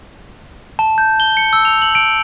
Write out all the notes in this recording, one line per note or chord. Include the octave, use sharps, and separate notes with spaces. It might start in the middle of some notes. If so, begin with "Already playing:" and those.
A5
G6
G7
C#7
E6
F7
F#7
D7